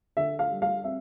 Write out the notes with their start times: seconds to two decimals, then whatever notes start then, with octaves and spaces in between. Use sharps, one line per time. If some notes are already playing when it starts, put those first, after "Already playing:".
0.17 D3 E5
0.39 F5
0.51 G3
0.62 F5
0.84 C4 E5